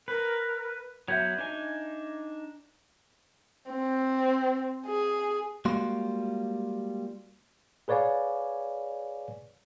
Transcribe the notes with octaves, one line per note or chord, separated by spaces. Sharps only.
A#4 B4
F#3 B3 F#4 E5 G6 G#6
D4 D#4 G#5
C4
G#4
G3 G#3 A#3 F4 F#4 C6
G#4 B4 C#5 D5 F5 G#5